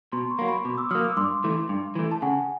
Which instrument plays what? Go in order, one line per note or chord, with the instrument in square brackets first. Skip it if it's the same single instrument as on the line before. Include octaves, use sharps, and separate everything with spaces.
[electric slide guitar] B2 [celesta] A#5 C6
[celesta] B5 C#6
[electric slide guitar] F#3 A#3
[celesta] B5 C#6
[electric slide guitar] B2 [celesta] C6 D6
[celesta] D6 E6
[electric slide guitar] F#3 [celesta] D#6 F6
[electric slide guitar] A#3
[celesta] D6 E6
[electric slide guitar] G2 [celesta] C6 D6
[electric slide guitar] E3 A3
G2
E3 A3
[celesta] A5
[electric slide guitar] C#3 [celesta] F#5 G#5